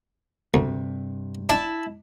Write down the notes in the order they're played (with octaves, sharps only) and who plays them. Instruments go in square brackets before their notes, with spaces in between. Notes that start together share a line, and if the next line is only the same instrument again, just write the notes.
[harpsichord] D2 [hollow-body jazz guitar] G2 C3
[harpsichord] D4 [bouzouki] E4 A5